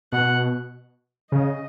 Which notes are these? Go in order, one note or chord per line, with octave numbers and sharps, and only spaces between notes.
B2 F#5
C#3 D#5